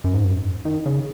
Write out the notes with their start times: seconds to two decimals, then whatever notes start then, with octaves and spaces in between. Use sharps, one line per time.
0.04 F#2
0.14 G#2
0.24 F#2
0.65 D#3
0.86 C#3